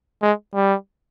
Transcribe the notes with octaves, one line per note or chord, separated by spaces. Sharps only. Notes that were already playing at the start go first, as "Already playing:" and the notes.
G#3
G3